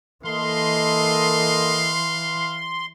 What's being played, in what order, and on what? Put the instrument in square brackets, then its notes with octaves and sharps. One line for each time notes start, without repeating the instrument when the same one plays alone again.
[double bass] E3 [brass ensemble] A#3 A4 D#5 [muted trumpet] F5 [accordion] C6